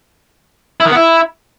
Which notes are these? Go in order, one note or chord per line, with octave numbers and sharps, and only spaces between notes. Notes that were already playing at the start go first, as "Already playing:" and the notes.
E4
D#3
B3
E4